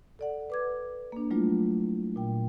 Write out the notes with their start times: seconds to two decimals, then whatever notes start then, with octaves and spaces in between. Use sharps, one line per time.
0.19 A4 D5 F#5
0.50 B4 D6 G#6
1.12 A#3 D4
1.31 F#3 G3 A3 D4 E4 F4
2.16 A#2 G5